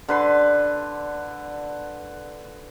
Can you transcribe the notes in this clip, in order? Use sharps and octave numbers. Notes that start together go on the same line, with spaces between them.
D3 B4 C6